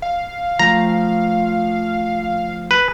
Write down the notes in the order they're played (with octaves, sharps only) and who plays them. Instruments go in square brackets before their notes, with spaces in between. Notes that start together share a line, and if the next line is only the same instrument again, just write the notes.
[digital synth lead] F5
[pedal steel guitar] F3 A3 G5 [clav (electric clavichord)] A#5
[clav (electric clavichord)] B4